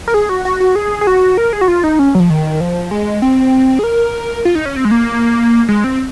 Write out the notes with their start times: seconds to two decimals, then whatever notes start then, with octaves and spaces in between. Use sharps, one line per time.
0.08 A#4
0.14 G#4
0.29 F#4
0.45 F#4
0.60 F#4
0.76 G#4
1.01 G#4
1.07 F#4
1.37 A#4
1.53 G#4
1.61 F#4
1.68 F4
1.84 D#4
1.99 C#4
2.15 F#3
2.20 F3
2.30 D#3
2.61 F3
2.91 G#3
3.22 C4
3.79 G#4
3.84 A#4
4.45 F4
4.55 D#4
4.66 C#4
4.76 C4
4.85 G#3
4.91 A#3
5.69 G#3
5.84 C4